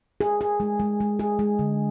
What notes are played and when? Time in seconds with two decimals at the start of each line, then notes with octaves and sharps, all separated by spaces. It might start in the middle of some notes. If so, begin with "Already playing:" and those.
0.21 G#4
0.41 G#4
0.60 G#3
0.80 G#3
1.00 G#3
1.19 G#4
1.39 G#3
1.59 D3